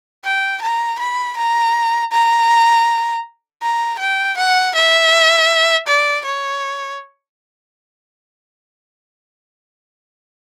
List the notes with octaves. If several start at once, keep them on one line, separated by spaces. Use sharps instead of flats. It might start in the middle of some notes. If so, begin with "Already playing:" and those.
G5
A#5
B5
A#5
A#5
A#5
G5
F#5
E5
D5
C#5